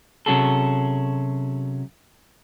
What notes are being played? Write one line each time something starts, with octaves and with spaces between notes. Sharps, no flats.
C3 F#3 C#4 F#4 G#4 A4